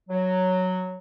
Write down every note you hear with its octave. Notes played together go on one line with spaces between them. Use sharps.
F#3